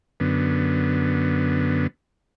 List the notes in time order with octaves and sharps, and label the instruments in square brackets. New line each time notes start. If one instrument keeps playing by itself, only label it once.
[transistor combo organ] F#2 D3 B3